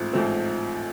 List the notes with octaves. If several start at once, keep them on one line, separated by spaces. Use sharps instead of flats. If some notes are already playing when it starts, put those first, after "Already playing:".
Already playing: A1 G#2 F3 A3 C4
A1 G#2 F3 A3 C4